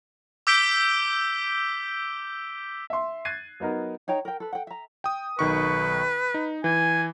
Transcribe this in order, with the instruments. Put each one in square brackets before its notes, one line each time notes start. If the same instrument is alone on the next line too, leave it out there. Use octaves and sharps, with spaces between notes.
[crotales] D6 E6 G6 B6 D7 G7
[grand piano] E5 C6
F#6 G#6 A6 C7 D#7
F#3 B3 D#4 A#4
[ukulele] D#4 C#5 G5 A#5
A#4 G5
A4 B4
F#5 G5
E5 A#5
[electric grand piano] G5 D#6
[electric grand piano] B1 D#3 C#6 [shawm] B4
[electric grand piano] D#4
[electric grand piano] E3 [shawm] G#5